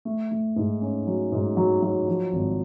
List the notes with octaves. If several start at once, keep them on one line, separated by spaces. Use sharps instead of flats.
A3
A3
G#2
C#4
F#3
G#2
F#3
F#3
F3
G#1